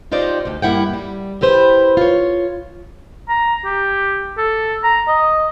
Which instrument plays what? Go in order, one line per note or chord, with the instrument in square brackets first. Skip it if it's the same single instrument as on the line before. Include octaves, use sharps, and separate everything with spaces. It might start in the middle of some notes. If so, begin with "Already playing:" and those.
[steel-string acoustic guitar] D#4 F4 G4 C5 D5 D#5
D2 D3
G2 A#3 E4 F#5 G5
G3
E4 G4 B4 C5 G5
F4 C#5
[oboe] A#5
G4
A4
A#5
D#5